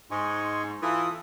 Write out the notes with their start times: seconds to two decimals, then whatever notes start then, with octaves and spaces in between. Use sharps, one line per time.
0.11 G#2 D#5 G#5 C6 C#6
0.83 E3 F4 A4 D#6